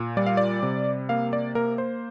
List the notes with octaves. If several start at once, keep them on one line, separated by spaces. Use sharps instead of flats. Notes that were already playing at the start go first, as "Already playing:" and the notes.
Already playing: A#2
G3 D5
F5
D5
C3
A#3 F5
D5
A#3 A#4
C5